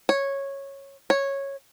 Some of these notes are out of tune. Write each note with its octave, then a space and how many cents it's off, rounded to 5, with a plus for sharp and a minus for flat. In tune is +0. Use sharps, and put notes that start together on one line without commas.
C#5 -10
C#5 -10